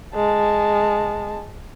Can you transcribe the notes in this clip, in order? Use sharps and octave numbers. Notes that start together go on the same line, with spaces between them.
G#3 A5